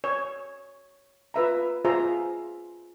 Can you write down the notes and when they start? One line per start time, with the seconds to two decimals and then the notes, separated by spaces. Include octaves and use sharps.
0.04 C#5
1.34 F4 B4 E5 A#5
1.85 F4 G#4 C5 E5 A#5